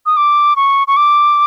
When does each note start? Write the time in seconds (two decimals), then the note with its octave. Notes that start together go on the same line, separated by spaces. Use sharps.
0.06 D#6
0.17 D6
0.56 C#6
0.87 C#6
0.97 D6